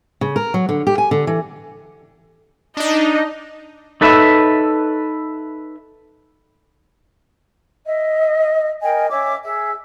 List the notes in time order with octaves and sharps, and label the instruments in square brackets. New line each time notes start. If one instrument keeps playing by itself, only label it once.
[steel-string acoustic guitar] C#3
A#4
F#3
D3
G4
G#5
D3
E3
[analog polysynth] D4 D#4 [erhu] D#5
[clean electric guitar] D#4 A4 B4 C#5 E5
[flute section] D#5 E5
A#4 D#5 G5 G#5
C#4 C#5 E5 D6
G#4 E5